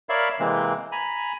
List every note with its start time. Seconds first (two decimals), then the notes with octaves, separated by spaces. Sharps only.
0.09 A#4 C#5 D5 E5 F5 B5
0.40 C3 E3 G#3 A#3 C4
0.92 G#5 A#5 B5